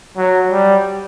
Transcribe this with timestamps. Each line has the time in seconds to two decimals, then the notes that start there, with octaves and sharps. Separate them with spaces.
0.17 F#3
0.51 G3